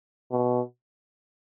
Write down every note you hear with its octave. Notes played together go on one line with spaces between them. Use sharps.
B2